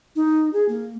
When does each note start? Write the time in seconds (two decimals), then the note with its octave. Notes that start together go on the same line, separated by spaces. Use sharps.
0.16 D#4
0.53 G#4
0.69 A#3